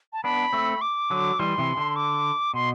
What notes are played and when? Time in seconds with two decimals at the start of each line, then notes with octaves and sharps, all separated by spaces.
0.13 A5
0.24 B3 D4 B5
0.53 A3 C4
0.81 D6
1.10 D3 F#3
1.39 E3 G3 C6
1.58 C3 E3
1.77 D3
1.96 D6
2.54 B2 C6